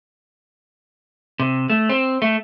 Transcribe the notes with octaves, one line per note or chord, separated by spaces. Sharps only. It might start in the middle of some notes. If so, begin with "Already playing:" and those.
C3
A3
C4
A3